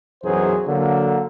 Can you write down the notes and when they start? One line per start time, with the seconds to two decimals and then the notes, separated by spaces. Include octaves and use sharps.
0.23 B1 F#2 E3 F#3 G#4 C5
0.67 D3 F#3 A#3